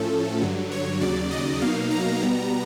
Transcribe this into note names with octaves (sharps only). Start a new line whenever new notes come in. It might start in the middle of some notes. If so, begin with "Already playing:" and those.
Already playing: A2 F3 A3 C#4 A4
G2 D3 F#3
C#5
D#2 C#3 F#3 D5
D#5
B2 F#3 A#3 D#4 F5
A#5
B2 G3 B3